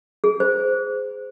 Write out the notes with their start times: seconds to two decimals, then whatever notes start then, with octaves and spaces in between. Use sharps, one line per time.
0.24 G#4
0.40 C5